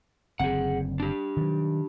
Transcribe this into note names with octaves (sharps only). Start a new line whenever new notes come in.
F#1 D3 C4 G#4 F#5
D4 G4
D#3 F#3